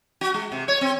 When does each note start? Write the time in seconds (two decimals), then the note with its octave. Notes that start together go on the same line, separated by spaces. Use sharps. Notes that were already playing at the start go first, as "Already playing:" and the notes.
0.21 F#4
0.34 G#3
0.52 C3
0.68 C#5
0.81 C4